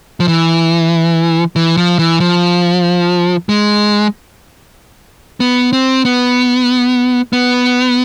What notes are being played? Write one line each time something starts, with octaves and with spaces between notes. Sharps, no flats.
F3
E3
E3
F3
E3
F3
G#3
B3
C4
B3
B3